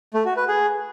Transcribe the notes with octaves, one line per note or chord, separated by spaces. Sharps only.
A3
F#4
B4
G#4